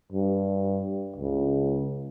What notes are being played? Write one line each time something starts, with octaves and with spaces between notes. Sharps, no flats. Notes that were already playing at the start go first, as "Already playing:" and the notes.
G2
C#2